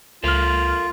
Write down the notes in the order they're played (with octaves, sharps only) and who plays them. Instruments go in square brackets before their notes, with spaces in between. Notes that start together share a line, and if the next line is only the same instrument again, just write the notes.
[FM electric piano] C#2 F6 [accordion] F4 [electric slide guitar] A4 A#4 F5